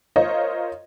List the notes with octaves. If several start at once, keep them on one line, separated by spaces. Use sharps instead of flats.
F4 A#4 C5 C#5 D#5